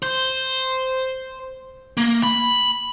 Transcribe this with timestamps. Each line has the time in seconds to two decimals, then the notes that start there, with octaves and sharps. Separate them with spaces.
0.02 C5
1.97 A#3
2.23 B5